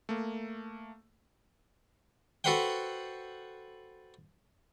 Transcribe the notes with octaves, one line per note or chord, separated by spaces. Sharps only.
A3 A#3
F#4 A4 B4 C5 F#5 G5